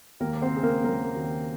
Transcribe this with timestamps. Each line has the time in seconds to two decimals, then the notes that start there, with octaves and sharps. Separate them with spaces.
0.20 D#2 A#3 A#4
0.41 C4 C5
0.52 C#3 G#4
0.63 A#3 A#4
0.84 F#3 A#3 A#4
1.16 D#2